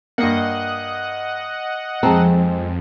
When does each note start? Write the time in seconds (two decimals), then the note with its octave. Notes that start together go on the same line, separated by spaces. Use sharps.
0.18 G2 A#3 D#5 F#5
2.03 F2 G#3 C4 A5 A#5